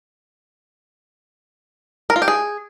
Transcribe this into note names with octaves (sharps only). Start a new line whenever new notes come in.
A#4
F4
G4
G#4